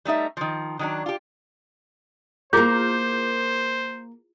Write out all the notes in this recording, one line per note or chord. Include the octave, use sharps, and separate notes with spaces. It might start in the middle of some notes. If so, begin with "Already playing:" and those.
G3 A3 D#4 E5
D#3 F3
D#3 F#3 D4
F4 G4
A#3 E4 F4 G#4 A#4 C5 D6 G6